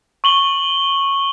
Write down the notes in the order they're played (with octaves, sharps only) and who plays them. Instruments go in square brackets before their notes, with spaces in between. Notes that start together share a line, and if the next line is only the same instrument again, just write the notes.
[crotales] C#6 F#7 G7